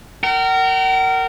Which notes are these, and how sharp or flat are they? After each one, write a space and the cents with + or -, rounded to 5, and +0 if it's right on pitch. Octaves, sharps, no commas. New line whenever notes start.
A#4 -20 F#5 +45